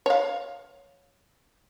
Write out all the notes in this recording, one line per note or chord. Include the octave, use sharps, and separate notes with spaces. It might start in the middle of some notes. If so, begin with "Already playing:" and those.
C#5 F5